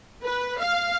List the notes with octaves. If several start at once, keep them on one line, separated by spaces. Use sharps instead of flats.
B4
F5